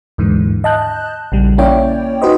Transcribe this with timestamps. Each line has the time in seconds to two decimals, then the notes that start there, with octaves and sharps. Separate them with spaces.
0.18 D#2 G#2 D3 E3
0.64 D#5 A5 F#6 G6
1.32 A#1 C#3 G3
1.58 A#3 C#4 E4 C#5 D5 G5
2.22 D#4 F#4 B4 C5 D#5